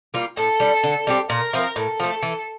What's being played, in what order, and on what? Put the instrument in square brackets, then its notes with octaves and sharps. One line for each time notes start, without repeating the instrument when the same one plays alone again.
[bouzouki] G3 A#3 F4
[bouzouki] A2 [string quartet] A4
[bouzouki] G3 D4
D3
G3 C4 G4
[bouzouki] A#2 [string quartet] A#4
[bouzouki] F3 C4 E4
[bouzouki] A2 [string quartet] A4
[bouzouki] F3 A3
E3